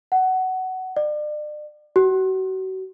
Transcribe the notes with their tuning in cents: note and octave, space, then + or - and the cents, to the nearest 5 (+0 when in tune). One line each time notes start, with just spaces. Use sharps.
F#5 +15
D5 +40
F#4 +35